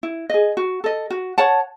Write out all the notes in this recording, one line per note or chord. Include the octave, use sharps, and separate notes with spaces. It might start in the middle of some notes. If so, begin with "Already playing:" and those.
E4
G#4 D#5
F#4
A4 D#5
F#4
C#5 F#5 A5